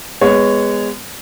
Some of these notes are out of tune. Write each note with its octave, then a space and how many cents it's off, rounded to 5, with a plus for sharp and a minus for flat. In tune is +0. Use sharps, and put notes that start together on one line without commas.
G#3 -20 B3 +0 C#5 +0